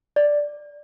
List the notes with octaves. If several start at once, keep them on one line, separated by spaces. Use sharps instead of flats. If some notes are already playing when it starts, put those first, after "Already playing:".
D5